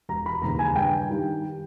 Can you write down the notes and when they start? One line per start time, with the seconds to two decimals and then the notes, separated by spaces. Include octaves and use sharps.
0.09 E1 A#5
0.26 B5
0.42 D#2 C#3 E3 A#5
0.59 G#5
0.75 G2 G5
1.09 D#3 G3